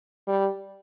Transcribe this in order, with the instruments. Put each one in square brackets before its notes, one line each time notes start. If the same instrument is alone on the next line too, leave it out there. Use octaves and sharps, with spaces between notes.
[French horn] G3